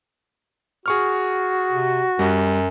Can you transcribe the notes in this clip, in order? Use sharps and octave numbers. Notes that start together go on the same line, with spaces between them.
F#4 G#4 C#6 F6
C3
F#2 G3